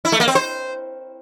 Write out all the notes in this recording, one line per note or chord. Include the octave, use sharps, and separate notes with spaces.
E4
A3
A#3
C4
C5